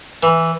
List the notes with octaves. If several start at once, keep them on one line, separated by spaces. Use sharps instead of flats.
E3